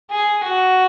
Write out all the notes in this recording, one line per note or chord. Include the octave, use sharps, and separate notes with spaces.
G#4
F#4